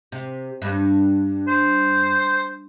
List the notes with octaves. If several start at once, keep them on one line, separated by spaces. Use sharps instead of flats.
C3
G2
C5